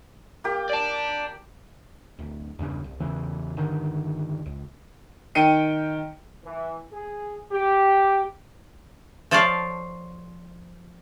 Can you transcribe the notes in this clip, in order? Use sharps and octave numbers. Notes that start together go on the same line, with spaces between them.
A#3 G4
D5 A5
D1
E2 G2 C#3
C2
E2 C#3 E3
G2 D3 D#3
C#2
D#3 G5 C#7 D#7
E3
G#4
G4
F3 A4 C#5 D5 F5